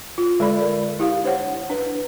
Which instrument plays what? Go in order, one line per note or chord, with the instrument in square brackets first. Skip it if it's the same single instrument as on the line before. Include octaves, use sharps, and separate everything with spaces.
[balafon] F4
D3 G#3 A4 D5 B5
A#4 D5
E4 G4 F5
D4 C5 C#5 F#5
D4 B4